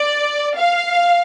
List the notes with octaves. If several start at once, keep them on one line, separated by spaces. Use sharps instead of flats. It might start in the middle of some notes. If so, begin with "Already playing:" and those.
Already playing: D5
F5